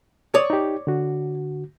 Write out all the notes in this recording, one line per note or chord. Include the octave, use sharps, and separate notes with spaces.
C#5 D5 D#6
D#4 G4
D3 F#4